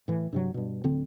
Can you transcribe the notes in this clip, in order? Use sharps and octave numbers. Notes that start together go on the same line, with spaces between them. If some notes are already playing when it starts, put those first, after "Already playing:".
A2 E3
G2 C3 F#3
G2 B2
D1 D3 C4